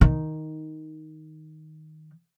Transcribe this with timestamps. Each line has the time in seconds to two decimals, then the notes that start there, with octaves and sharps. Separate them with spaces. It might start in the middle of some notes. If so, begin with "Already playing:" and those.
0.01 D#3 D#4